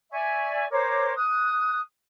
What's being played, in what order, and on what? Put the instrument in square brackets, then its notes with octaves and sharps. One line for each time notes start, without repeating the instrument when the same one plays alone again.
[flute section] D5 E5 G#5 C#6
A#4 C5 C#5 D6
D#6 F#6